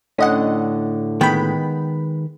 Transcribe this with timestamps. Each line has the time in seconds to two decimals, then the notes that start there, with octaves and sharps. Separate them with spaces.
0.18 A2 D3 C#4 D#5 F#5
1.21 D#3 G#3 B3 G5 B5